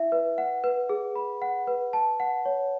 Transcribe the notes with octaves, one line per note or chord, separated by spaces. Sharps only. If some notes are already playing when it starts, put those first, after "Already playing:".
Already playing: E4 E5
B4
F#5
B4
G#4
B5
F#5
B4
A5
F#5
C#5